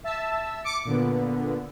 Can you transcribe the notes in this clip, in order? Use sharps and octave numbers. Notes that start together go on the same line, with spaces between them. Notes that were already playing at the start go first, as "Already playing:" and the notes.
E5 A5 E6
D6 C#7
A#2 D3 B3